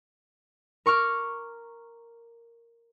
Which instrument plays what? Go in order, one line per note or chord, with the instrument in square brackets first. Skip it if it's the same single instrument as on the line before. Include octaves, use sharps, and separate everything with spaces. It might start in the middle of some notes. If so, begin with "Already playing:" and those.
[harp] A#4 C#6 D6 F6